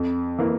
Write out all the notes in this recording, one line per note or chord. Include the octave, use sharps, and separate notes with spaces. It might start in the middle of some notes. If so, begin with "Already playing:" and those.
Already playing: F2
E3 A#3